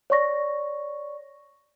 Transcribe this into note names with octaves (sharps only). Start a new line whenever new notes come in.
C#5 D5 C#6 A#6